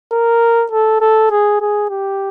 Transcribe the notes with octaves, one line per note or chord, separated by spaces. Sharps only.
A#4
A4
A4
G#4
G#4
G4